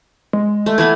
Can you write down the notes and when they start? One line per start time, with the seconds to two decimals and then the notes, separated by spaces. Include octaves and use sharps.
0.33 G#3
0.66 A3
0.78 E3 A3 B3 G#6